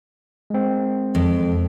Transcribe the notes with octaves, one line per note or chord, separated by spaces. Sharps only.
G#3 C4
F2